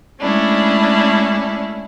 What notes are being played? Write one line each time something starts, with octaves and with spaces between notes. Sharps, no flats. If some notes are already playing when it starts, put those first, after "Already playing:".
G#3 A3 C#4 D4 E4